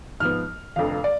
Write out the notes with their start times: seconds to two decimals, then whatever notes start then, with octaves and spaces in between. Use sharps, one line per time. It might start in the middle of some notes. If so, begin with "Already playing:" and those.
0.20 G#2 F3 B3 F6
0.76 F1 F2 D3 F3 F5
1.04 D5